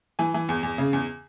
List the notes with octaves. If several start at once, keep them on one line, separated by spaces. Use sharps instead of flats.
E3 G#5
E3
E2
E2
C#3
E2